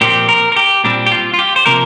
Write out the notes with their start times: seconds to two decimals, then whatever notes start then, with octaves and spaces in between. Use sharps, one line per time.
0.01 A#2 F3 C4 G4
0.29 A#4
0.52 A#4
0.56 G4
0.84 A#2 G3 C4 D4
1.06 G4
1.12 F4
1.34 F4
1.39 G4
1.56 C5
1.66 C3 F3 A#3 A#4